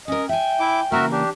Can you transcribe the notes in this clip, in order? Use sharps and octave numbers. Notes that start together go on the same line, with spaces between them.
C#4 A#4 D#5
E5 G5 G#5
E4 D6
C#3 E3 A#3 F#4 A#4 E5
D4 G4